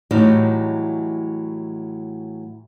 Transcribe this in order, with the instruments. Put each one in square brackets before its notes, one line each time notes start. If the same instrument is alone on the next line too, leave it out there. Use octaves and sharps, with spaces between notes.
[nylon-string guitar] A2 E3 F#3 G3 D#4